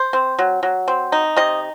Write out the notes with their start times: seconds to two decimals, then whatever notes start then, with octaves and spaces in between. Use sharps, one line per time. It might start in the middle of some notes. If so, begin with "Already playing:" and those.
Already playing: C5
0.13 C4
0.39 F#3
0.63 F#3
0.88 C4
1.12 D#4
1.36 C3 D#5